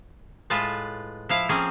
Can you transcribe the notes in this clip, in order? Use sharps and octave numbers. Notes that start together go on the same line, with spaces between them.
A2 G#3 F4 B4 A5
F3 E4 F5
F3 A#3 C4 C#4 G#4